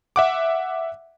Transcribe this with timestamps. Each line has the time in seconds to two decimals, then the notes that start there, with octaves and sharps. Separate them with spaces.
0.16 E5 F#5 D6